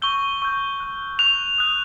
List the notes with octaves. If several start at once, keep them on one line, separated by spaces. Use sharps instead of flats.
C#6 E6 G6 G7
C#6 E6 G6
C#6 F#6
C#6 F#6 F7
D#6 F#6